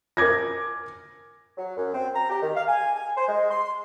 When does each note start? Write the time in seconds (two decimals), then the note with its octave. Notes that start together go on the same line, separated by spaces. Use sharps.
0.17 A#4 G#5 D6 G#6 A#6
1.57 F#3
1.77 F#2
1.94 C4
2.15 A#5
2.30 G4
2.42 D#3
2.55 F5
2.68 G#5
2.96 G#5
3.17 C5
3.28 G#3
3.50 C6